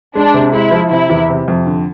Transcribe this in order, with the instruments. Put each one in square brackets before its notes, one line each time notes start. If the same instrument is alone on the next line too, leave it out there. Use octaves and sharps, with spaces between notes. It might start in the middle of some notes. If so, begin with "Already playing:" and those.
[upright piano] G#3 [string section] D4
[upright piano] C3
[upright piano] G#3 [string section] E4
[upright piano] F3
[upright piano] C3 [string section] E4
[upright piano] E2
C3
F2
D3